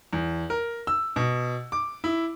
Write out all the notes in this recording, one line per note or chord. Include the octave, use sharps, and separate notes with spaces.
E2
A#4
E6
B2
D6
E4